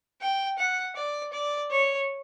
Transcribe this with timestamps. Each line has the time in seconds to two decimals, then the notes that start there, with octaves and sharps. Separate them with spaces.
0.22 G5
0.59 F#5
0.96 D5
1.33 D5
1.71 C#5